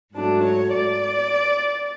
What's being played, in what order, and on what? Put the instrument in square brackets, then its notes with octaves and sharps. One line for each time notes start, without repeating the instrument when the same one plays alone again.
[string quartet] G#2 F#3 A3 D4
C#5
D5